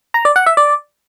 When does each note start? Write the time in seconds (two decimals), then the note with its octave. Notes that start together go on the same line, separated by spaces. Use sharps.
0.14 A#5
0.25 D5
0.36 F#5
0.46 E5
0.57 D5